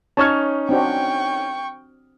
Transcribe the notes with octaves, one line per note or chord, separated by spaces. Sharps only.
C#4 D#4 C#5 A5 F6
C4 D4 F#4 G5 C#6